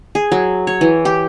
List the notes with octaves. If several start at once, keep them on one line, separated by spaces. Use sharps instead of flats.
G#4
F#3
C#5
E3
G4